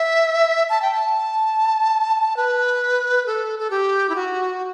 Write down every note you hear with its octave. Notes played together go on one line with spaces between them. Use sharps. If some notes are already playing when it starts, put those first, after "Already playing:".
Already playing: E5
A5
G5
A5
B4
A4
A4
G4
E4
F#4